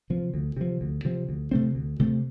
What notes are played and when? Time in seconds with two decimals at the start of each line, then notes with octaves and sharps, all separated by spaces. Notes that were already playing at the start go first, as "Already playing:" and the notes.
0.10 C3 F3
0.34 D2
0.56 C3 F3
0.81 D2
1.05 C3 F3
1.29 D2
1.51 C3 A3 C4
1.75 D2
1.99 C3 A3 C4